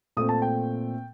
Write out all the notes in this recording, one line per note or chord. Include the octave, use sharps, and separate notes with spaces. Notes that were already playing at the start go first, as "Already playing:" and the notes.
A#2 A3 C4 D#6
A5
G5